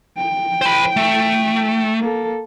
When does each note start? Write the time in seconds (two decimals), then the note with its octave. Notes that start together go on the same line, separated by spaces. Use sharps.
0.17 G5
0.61 C5 B5
0.97 A3
2.00 A#3 A4